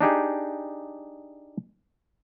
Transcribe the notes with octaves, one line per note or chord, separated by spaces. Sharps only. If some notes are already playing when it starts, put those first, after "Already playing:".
D4 D#4 G4 G#4